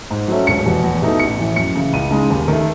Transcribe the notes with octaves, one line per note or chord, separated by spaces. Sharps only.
G#2
F#3 A3 C#4
E1 C#7
E2 B2
E2
B2 A3 D#4
A1 C#7
A2 E3
F#2 C#7
C#3 E3
C#2 D#7
C#3 G#3 D#4
D#2
D#3 A3